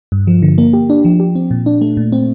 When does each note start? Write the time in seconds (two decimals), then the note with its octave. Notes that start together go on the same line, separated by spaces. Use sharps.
0.12 G2
0.27 F3
0.42 D3
0.58 A#3
0.73 G4
0.90 D4
1.05 F3
1.20 G4
1.35 C4
1.51 A#2
1.66 D4
1.81 A3
1.97 A#2
2.12 C4